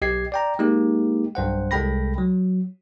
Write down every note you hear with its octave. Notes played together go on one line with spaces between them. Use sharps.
B1 G4 D#5 G#6 C7
D5 G5 A#5
G#3 A#3 D#4 G4
B1 G2 C5 F#5
C2 G#3 A4 G5 B5 A#6
F#3